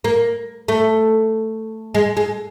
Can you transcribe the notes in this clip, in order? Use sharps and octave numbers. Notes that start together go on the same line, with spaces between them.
A#3
A3
G#3
G#3